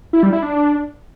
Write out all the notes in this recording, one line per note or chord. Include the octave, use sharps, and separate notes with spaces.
E4
G3
E4
D4